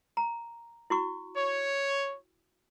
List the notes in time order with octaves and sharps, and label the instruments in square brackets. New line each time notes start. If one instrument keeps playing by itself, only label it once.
[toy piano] A#5
E4 F#4 C#6
[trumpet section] C#5